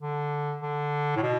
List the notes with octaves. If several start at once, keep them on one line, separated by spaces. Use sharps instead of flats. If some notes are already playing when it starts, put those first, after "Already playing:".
D3
D3
A2
B2